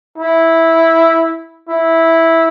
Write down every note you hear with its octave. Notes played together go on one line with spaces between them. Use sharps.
E4
E4